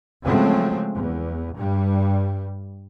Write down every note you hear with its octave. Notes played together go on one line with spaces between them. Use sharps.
C#3 F3 F#3 G#3 A3 C4
E2
G2 G3